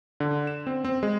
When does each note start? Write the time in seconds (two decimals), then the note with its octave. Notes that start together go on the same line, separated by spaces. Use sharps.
0.20 D3
0.47 E7
0.67 C4
0.84 C4
1.03 G#3